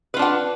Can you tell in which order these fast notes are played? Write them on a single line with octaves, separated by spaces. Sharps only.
B4 F4 D4 F#5